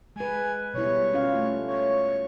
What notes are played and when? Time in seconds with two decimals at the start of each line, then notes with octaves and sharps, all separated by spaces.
0.16 G#3 B4 G#5
0.74 B2 G3 E4 C#5
1.13 C#4 F4 F5
1.35 A3
1.67 C#5